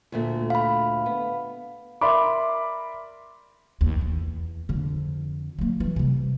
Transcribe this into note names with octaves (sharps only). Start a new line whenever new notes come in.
D2 A#2 A3
F5 B5
B3
A#4 D5 E5 B5 C6 D6
D#2
E2
F2 D3
F#3 A#3
E3
C3 G3